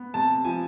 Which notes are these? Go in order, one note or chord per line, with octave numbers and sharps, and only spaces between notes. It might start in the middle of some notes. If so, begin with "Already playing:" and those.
Already playing: B3
C3 A5
F3 G#5